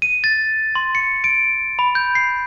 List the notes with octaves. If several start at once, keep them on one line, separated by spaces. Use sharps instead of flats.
D#7
A6
C6
C#7
D7
B5
G6
C7